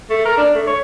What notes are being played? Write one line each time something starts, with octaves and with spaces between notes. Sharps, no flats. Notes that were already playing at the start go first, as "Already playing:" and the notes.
A3
A#4
D4
A3
C#5